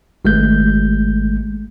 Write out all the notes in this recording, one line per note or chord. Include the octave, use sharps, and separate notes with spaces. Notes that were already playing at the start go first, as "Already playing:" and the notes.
G#1 G#3 A3 G6